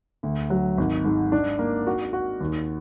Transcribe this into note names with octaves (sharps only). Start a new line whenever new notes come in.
D2
F#3
G#1
G#2
D4
A#3
F#4
F#4
D#2